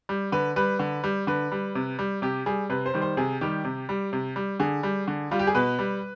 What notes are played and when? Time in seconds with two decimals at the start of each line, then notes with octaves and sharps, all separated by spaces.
0.09 G3
0.32 D3 B4
0.56 G3 B4
0.79 D3
1.04 G3
1.27 D3 B4
1.52 G3
1.75 C3
1.99 G3
2.22 C3 G4
2.46 G3 G#4
2.70 C3 B4
2.86 C5
2.94 D#3 G3
3.01 C5
3.17 C3 G#4
3.41 D#3 G3 G4
3.64 C3
3.89 G3
4.13 C3
4.36 G3
4.60 D3 G#4
4.83 G3
5.08 D3
5.31 G3 F4
5.39 G4
5.47 G#4
5.55 B2 B4
5.79 G3